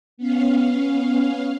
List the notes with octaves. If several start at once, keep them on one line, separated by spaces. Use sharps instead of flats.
B3 C#4 F5